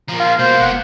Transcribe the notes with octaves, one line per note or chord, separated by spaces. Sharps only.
F3 A#3 A#5
F4 F5
B2 A#3 B3 C5
F1 F#5